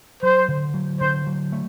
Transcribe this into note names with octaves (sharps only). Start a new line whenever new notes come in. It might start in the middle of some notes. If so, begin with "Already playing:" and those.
F#3 C5
D3
F#3
D3 C5
F#3
A3